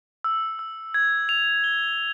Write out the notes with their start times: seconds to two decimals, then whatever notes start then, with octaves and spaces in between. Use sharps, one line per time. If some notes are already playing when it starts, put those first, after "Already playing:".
0.24 E6
0.59 E6
0.94 G#6
1.29 F7
1.64 G7